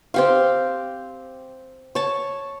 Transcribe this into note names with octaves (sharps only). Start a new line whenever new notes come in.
C4 G4 F5
C#5 A5